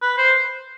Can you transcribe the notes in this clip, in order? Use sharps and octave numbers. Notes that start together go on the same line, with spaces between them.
B4
C5